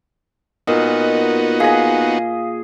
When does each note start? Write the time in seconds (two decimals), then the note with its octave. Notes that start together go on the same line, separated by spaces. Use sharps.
0.67 A#2 B3 D#4 F#4 A#4 D#5 D#6
1.60 G#4 D#5 F5